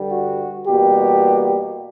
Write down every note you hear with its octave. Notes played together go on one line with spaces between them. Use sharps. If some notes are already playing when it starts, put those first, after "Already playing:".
Already playing: G2 D3 G3
F#4
E2 B2 G3 A#3 G4